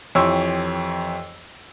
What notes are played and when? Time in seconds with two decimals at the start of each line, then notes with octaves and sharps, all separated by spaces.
0.15 F2 E3 G4 C#5 C6 E6